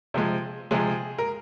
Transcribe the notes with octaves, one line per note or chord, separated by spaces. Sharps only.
C3 F3 G#3
C3 F3 G#3 G#4
A#4